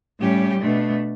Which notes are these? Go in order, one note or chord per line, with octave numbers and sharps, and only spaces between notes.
A2 G3 C#4 G4
B2 A3 D4